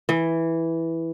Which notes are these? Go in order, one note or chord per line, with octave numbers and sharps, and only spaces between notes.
E3